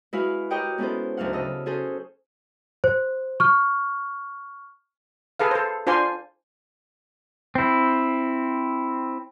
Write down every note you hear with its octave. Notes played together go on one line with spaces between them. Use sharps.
G#3 E4 F#4 B4 F5
G4 A#4 C#5 D#5 F#5 G5
G#3 B3 C#4 E4 A4 C5
D2 G#2 F#3 F5 F#5
C#3 A4 D#5 F5 E6
C#4 F#4 G#4 A4 C5
C5
C#6 F6
G#4 A4 B4 F5
A4 C5
D4 F4 C5 D5 G#5 C6
C4 E4